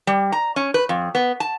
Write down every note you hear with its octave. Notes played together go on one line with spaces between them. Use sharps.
G3
A#5
C#4
B4
F2
B3
A5